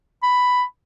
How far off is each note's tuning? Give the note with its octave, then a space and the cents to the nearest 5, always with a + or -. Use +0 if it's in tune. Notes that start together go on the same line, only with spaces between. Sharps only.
B5 +5